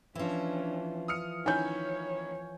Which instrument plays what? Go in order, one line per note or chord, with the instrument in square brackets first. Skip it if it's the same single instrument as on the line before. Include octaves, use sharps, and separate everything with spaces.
[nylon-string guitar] E3 F3 [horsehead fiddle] C#4 D4
[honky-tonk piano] D#6 F6 C#7
[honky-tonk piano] D#3 C#4 E4 [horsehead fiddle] C#5 [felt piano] G#5 G6